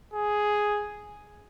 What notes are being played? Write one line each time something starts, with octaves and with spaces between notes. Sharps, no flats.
G#4